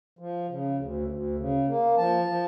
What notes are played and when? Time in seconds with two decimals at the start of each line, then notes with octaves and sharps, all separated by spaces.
0.19 F3
0.49 C#3
0.78 D2
1.08 D2
1.38 C#3
1.68 A#3
1.97 F3 A5
2.27 F3